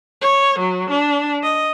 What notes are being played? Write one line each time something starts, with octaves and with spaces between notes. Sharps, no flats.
C#5
F#3
D4
D#5